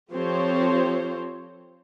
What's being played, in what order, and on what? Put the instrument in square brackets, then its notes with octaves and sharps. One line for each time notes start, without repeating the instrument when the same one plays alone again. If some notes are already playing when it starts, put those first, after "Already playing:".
[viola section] F3 C4 G4 A4 C5 C#5